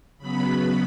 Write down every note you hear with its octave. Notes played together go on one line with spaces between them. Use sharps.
C#3 F#3 B3 B5